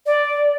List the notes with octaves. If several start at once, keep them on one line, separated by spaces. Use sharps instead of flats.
D5